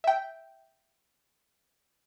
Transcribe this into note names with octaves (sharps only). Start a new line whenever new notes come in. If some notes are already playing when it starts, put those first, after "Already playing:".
E5 G5